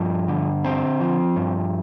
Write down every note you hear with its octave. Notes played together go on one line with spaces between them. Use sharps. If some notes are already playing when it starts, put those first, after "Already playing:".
Already playing: G2 F3
D3
C4
F3
G2